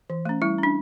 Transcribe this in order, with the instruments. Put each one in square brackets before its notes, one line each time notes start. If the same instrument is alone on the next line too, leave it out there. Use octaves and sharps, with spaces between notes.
[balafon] E3
A3 C#4
G3 E4
C#4
D4